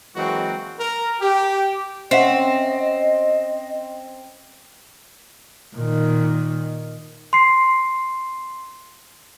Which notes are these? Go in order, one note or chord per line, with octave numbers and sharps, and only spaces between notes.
E3 F#3 G#3 A#3 C4 F#4
A#4
G4
C4 C#4 D#5 E5 F#5
A#2 D#3
C6 C7